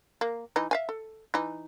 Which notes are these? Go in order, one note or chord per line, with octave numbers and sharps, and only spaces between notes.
A#3
E3 D#4
E5 F5 G#5
A4
E3 D#4